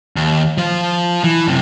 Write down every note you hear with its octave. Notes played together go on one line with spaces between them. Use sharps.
D#2
F3 C5
E3
F#2 C3